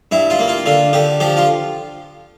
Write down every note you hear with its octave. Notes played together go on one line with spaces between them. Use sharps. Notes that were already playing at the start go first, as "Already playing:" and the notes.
G2 E4
F4
A#3
F4
D3 F4
D3 G4
F3 G4
F4